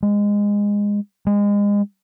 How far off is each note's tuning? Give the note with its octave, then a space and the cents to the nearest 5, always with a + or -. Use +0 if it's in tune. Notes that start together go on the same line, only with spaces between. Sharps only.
G#3 -20
G#3 -30